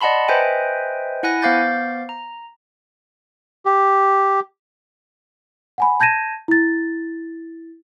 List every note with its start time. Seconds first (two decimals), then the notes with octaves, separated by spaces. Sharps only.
0.01 D5 D#5 F#5 A5 B5 C6
0.28 B4 C5 D#5 E5 G5 G#5
1.23 E4 F#5 G#5 F#6 A#6
1.42 B3 C5 F5 D6 G6 A6
2.09 A#5
3.66 G4
5.78 F#5 G#5 B5
6.00 A5 G6 G#6 A#6 D#7 E7
6.48 E4 A6